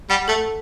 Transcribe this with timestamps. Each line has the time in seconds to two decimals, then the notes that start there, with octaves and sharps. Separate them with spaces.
0.10 G3 F#5
0.28 A3 A4 A5